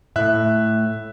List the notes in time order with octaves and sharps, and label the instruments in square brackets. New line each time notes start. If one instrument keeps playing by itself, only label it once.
[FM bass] A2 [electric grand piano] E5 F#6